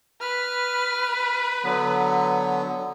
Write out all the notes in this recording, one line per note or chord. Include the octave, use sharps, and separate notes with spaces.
B4 F6
D3 F#3 B3